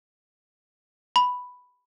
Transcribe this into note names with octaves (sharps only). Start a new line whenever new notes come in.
B5